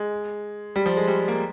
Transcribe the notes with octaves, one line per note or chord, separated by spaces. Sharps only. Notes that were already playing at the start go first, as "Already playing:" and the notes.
Already playing: G#3
G3
F3
G#3
G3
A#3